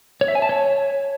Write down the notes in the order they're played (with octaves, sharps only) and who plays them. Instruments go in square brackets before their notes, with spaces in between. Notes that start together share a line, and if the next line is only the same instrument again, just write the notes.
[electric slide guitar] C#5
E5
G#5
A5
C#5